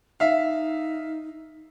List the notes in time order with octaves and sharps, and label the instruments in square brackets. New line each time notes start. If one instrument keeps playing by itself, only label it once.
[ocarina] D#4 [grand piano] E5 F5